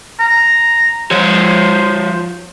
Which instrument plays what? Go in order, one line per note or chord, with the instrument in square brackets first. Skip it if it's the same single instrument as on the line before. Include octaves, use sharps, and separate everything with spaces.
[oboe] A#5
[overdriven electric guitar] F3 C#5 [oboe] C5